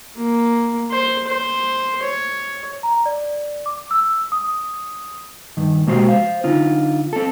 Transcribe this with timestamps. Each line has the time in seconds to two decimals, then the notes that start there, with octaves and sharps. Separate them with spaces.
0.17 A#3
0.91 C5
1.27 C5
2.03 C#5
2.83 A#5
3.06 D5
3.66 D6
3.91 E6
4.32 D#6
5.57 G2 D#3
5.87 B2 G#3 A#3 F#4 G4 C5
6.08 C5 F5
6.44 D3 D#4 F4
7.13 C4 A4